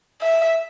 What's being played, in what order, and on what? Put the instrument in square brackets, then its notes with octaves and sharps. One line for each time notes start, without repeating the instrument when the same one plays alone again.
[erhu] E5